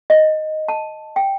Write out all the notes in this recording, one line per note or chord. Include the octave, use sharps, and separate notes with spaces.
D#5
A5
G5